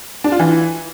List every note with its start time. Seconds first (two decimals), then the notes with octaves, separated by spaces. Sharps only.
0.24 D4
0.32 F4
0.39 E3